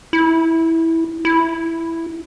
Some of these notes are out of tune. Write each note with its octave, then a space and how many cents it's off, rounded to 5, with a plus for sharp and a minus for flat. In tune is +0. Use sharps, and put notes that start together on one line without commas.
E4 -10
E4 +5